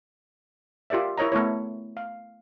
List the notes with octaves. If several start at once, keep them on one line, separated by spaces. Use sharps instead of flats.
F4 G4 A#4 D5 E5
E4 A#4 C#5 D#5 A#5
A3 B3 E4 C#5
F5